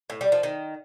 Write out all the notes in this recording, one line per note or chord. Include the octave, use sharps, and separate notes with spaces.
A2
G3
F3
D#3